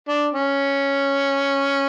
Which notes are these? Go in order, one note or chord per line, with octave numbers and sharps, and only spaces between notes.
D4
C#4